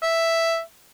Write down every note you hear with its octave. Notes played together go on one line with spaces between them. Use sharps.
E5